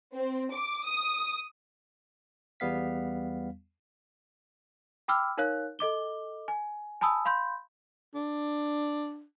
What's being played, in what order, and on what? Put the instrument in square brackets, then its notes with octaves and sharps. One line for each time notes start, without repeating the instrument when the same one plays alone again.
[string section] C4
D6
D#6
[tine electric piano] E2 G3 B3 F5 B6
[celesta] G5 B5 D6 E6 F6
D#4 A#4 C#5 F5 F#6
A4 D#5 D6 G7
G#5
G#5 A5 B5 D#6 E6
F5 B5 C6 G6
[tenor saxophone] D4